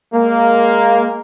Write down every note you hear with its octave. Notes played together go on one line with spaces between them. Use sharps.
G#3 A#3